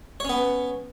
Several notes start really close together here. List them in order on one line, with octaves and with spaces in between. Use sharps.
C#5 C#4 B3